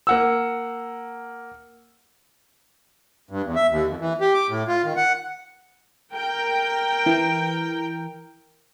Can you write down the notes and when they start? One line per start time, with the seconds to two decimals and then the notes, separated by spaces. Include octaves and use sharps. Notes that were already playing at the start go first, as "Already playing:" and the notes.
0.07 A#3 F#5 E6
3.31 G2
3.43 E2
3.55 E5
3.70 D#2
3.87 F2
4.00 E3
4.21 G4
4.34 D6
4.49 A2
4.68 F4
4.84 D#3
4.96 F#5
6.13 A#4 G5
7.06 E3